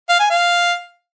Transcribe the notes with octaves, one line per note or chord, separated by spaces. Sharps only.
F5
G#5
F5